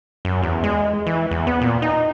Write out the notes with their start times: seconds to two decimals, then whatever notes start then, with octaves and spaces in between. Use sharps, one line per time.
0.25 F#2
0.43 E2
0.64 G#3
1.07 E3
1.31 E2
1.47 B3
1.62 A#2
1.82 D#4